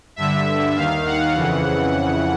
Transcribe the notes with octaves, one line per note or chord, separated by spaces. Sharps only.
G2 D3 E5
D#2 D#3 F5
F#5
F2 C#3 E3